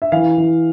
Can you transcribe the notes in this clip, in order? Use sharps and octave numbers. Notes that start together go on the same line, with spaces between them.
E5
E3 F5
E3